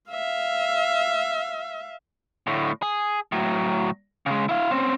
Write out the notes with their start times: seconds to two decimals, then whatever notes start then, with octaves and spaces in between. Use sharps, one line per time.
0.10 E5 F5
2.47 D2 A2
2.82 G#4
3.32 A2 F#3
4.26 C#3 G#3
4.49 E4 F5
4.71 C4 C#4